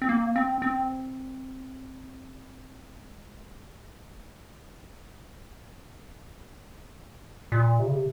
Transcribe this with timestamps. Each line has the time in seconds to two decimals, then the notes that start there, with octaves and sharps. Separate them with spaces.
0.02 C4
0.09 A#3
0.36 C4
0.62 C4
3.01 G#3
6.20 A#3
6.39 C4
6.59 C#4
6.79 C4
6.99 G#3
7.26 C3
7.52 A#2
7.79 C3
7.86 C#3
7.94 C3